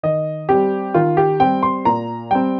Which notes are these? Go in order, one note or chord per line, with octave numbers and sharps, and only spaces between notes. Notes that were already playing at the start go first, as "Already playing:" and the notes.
D#3 D#5
G3 C4 G4
D#3 F4
G4
G3 C4 G5
C6
A#2 A#5
G3 C4 G5